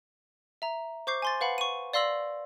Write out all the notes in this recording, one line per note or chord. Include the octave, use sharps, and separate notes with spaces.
E5 A#5
C5 C#6 D6 G6 C7
G#5 C6 A6
B4 F5 F#5 B5
C#6 D#7
D5 F5 C6 E6 A#6 F#7